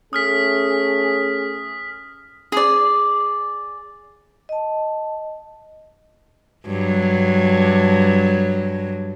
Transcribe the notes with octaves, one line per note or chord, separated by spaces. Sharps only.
A3 C#4 G#4 D#6 F6 B6
G#4 D5
D#5 A5
G2 F#3